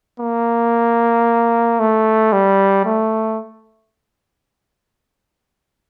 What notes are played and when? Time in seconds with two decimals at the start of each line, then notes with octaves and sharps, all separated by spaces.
0.20 A#3
1.80 A3
2.33 G3
2.85 A3